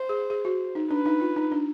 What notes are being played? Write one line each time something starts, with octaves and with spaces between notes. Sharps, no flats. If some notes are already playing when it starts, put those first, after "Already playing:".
Already playing: C5
G#4
G#4
F#4
D#4
D4 B4
D#4
F4
D#4
D4